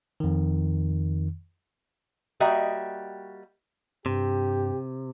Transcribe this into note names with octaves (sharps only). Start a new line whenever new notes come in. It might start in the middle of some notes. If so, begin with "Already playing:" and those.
F2 D#3
G3 A#3 F#4 D#5 E5 G5
G2 C3 G4